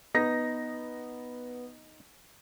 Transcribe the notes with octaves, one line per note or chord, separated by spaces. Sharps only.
B3 D#4 A#6